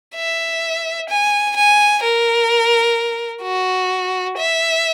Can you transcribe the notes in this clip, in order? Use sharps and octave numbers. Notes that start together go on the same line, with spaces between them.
E5
G#5
G#5
A#4
F#4
E5